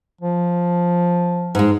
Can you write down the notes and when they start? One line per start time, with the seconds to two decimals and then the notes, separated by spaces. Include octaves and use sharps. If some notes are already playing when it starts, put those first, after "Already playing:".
0.21 F3
1.55 G#2 G#3